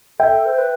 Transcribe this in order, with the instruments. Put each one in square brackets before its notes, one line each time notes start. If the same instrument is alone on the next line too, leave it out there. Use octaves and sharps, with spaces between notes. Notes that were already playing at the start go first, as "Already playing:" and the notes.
[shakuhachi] A4 [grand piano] E5 G5
[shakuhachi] C5
B4